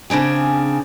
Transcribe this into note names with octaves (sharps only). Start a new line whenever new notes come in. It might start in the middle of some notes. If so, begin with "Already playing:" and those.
C#3 C4 D4 G#4